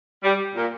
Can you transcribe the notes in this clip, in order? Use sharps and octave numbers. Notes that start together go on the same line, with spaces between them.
G3
A#2